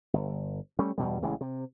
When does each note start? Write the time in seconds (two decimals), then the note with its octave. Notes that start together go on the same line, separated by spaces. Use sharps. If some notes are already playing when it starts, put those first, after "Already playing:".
0.14 G1
0.79 G3 A3 C#4
0.98 E2 G2 B2 G3
1.22 A1 C#3 E3 G#3
1.41 C3